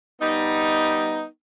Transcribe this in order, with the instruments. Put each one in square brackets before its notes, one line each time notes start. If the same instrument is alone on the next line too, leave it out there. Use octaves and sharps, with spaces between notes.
[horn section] G3 B3 D#4